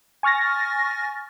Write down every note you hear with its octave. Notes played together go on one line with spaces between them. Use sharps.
G#5 C#6 F6 A6 A#6